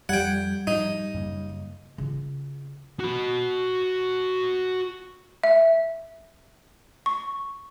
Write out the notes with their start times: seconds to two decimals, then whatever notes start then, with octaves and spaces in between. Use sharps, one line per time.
0.09 F2 G3 F#5 G5 G#6
0.67 G#2 F3 D#4
1.14 F#2 C#3 A#3
1.98 C#3 F4
3.00 F#4 B5
5.44 E5
7.06 C#6